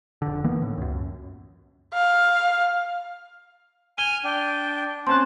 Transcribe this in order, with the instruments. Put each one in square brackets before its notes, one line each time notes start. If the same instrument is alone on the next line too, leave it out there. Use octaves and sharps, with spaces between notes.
[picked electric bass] F1 D3
D#3 E3 A#3 B3
A2
C#2 F#2
[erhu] F5
[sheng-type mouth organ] G#5 F6 [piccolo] D#7 [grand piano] G7
[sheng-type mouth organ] D4 [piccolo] G5
[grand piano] C4 C#4 F#6 [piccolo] A5 [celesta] C6